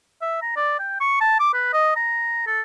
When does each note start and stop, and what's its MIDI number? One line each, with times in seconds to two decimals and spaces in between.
0.22 0.39 76
0.42 0.54 82
0.56 0.75 74
0.79 0.97 79
1.00 1.19 85
1.21 1.38 81
1.40 1.52 86
1.54 1.68 71
1.73 1.94 75
1.96 2.46 82
2.47 2.61 69